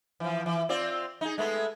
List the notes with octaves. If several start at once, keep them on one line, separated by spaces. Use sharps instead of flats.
E3 F3
E3
C4 F4 D5
D#4 G#4
G#3 A3 B3